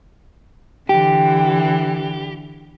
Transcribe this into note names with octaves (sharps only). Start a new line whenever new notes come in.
D3 E3 G4